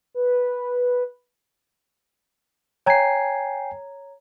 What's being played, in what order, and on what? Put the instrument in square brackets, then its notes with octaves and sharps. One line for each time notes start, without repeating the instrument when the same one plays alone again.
[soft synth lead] B4
[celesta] C#5 A#5 G#6 [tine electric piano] G5 G#5 C7